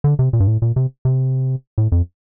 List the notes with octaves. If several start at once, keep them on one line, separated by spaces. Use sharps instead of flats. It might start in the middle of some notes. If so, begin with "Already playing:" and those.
D3
C3
A#2
G2
A2
A#2
C3
C3
A2
F2